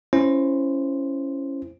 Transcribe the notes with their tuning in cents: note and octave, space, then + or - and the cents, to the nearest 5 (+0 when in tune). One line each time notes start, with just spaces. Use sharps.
C#4 -10 E4 +20 C5 +0